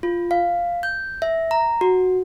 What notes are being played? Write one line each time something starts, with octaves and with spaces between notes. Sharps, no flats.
F4
F5
G6
E5
A#5
F#4